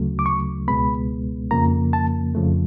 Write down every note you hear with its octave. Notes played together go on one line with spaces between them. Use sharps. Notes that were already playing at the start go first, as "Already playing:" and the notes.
Already playing: D2 C#3 F#3 A3
D6
C#6
C#2 B2 G#3 B3 B5
F2 C#3 F3 A#3 A#5
A5
F2 C#3 F3 A3